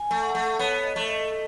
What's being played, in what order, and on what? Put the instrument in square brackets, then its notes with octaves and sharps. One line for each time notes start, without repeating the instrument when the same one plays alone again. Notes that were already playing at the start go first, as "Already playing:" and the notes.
Already playing: [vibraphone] G#5
[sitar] A3
[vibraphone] F#5
[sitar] A3
[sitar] B3 [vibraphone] C#5
[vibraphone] D#5
[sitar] A3
[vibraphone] D#5